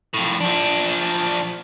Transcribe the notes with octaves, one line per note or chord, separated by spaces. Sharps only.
F2 A2
F3 D4